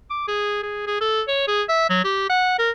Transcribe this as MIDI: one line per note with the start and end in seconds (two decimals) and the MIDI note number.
0.10 0.23 86
0.28 0.61 68
0.63 0.84 68
0.87 0.98 68
1.01 1.22 69
1.28 1.44 73
1.47 1.63 68
1.69 1.85 76
1.89 2.04 54
2.04 2.28 67
2.29 2.54 78
2.58 2.71 70